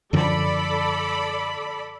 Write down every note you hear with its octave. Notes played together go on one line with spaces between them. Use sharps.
F#2 D3 F3 A4 D5 B5